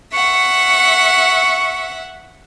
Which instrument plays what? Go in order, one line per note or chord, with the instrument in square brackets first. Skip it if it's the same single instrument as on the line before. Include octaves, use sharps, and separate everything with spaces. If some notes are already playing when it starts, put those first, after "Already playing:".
[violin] E5 F#5 [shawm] C#6